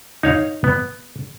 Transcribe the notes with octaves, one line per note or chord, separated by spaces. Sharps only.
D#4 C#5 F5
B3